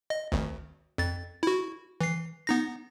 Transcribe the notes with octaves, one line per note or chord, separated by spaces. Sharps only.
D#5
G#1 D2
F2 A6
E4 F#4
E3 C7
B3 D#4 A#6